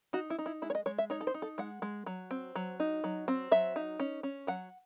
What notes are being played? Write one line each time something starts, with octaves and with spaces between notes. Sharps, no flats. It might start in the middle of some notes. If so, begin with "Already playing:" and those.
D#4 F#4
E4
D#4
E4
G#3 E4
C#5
D#5
G#3 C#5
E5
D#4 C#5
A4
C5
D#4
A4
G#3 F#5
G#3
F#3
C4
F#3
D#4
F#3
C4
F#3 E5
D#4
C#4
C#4
F#3 F#5